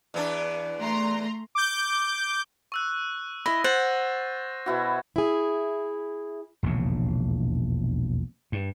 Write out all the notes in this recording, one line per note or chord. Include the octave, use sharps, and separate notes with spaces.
E2 B3 D4
A3 A#5 C6
D6 G6
C#6 E6 F#6
E4 D#5 B5 A#6
C5 F#5 A6
B2 E4 F#4
E4 G#4
E1 A#1 D#2 C#3
G2